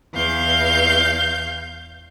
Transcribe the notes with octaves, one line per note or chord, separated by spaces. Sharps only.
E2 F5 G6